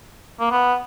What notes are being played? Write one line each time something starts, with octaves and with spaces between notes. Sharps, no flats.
A#3
B3